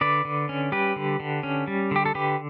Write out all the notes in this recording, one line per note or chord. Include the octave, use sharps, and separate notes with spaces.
D3 B4 D5
D3
C#4
G3 G4 B4
D3
D3
C#4
G3
D3 G4
A4
D3 G4 B4